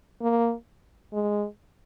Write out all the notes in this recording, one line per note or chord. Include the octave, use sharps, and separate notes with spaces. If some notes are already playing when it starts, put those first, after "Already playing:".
A#3
G#3